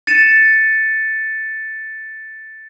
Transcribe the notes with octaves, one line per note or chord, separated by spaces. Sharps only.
A6 C#7 D#7 E7